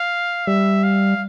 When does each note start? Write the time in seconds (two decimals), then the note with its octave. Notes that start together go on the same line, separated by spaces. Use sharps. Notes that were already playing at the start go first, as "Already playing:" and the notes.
Already playing: F5
0.47 G3 E5
0.84 F5